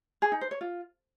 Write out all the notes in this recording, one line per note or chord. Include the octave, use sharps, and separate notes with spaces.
G#4
D#4
C5
C#5
F4